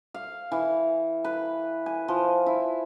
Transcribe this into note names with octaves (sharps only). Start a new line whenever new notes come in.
F5
E3
B4
G#5
F3
E4